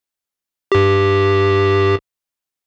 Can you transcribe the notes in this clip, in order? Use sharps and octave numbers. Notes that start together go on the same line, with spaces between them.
G2 G4